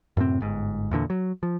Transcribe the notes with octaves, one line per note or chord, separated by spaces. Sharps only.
F#2 A2 C3 C4
G1 G#2
E2 A#2 D3
F#3
F3